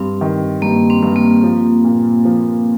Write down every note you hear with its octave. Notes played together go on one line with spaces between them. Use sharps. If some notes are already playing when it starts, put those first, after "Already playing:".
Already playing: G2 C4
D#3
G2 A#3
C4
G2
A#3
F3
A#2
F3